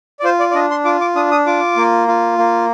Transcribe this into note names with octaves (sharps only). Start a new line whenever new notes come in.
D5
F4 C5
D5
D5
D4 D#5
C6
F4 D6
D6
D4 D#6
D#6
F4 D6
A#3
F4
A#3